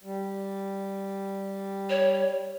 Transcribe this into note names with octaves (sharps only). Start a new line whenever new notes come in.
G3
C#5